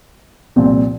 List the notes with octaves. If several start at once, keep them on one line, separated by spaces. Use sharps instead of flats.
C2 A#2 F3 C4